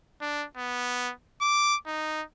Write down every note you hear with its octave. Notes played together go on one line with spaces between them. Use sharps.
D4
B3
D6
D#4